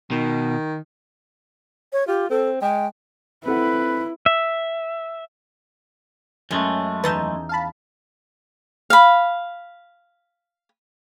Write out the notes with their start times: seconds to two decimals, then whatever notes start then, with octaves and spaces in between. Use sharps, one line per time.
0.11 B2 D#3
1.93 C#5
2.07 F4 G4
2.30 C4 A4
2.62 G#3 G5
3.46 C4 E4 A4 B4 F#5
4.26 E5
6.51 F#2 G#3 A3 C#4
7.04 E2 D#4 B4 E5 A5 G6
7.49 F5 A5 B5
8.90 F5 B5